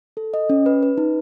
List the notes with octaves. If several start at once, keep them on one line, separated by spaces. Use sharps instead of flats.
A4
D#5
C#4
B4
B4
D#4